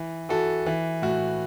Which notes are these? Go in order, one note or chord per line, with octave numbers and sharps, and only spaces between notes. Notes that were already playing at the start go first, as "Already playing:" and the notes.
Already playing: E3
E3 F#4 A4
E3
A2 F#4